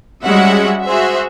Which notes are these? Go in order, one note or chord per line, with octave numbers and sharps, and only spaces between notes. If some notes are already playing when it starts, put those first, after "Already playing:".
G3 G#3 C#4 F#4 E5 F#5
F#4 G#4 C5 E5